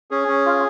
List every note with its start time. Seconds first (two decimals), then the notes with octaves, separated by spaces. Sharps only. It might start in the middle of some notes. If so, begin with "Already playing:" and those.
0.11 C#4 G#4
0.28 C#4
0.46 F4